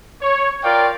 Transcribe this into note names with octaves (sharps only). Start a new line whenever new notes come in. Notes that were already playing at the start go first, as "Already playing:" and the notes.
C#5
F4 A#4 D5 F5 G5